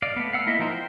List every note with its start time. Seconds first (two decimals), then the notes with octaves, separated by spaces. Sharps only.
0.02 D5 D#5 F5
0.16 A3 B3
0.33 F5 F#5 E6
0.47 A#3 E4 D#5 E5
0.59 F3 D#4 A#4 C5
0.71 G5